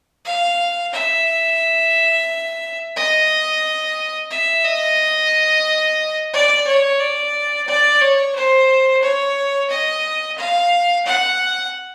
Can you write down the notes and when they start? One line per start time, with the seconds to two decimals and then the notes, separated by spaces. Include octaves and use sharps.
0.25 F5
0.93 E5
2.96 D#5
4.31 E5
4.65 D#5
6.34 D5
6.67 C#5
7.00 D5
7.67 D5
8.01 C#5
8.35 C5
9.02 C#5
9.70 D#5
10.37 F5
11.06 F#5